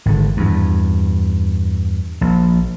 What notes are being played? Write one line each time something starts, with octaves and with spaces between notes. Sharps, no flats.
G#1 D3
E2 G2
A#1